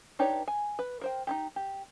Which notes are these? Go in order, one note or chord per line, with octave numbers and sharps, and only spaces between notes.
D4 D#4 G4 B4 C#5
G#5
B4
A#4 C5 G5
D#4 E4 G4
G4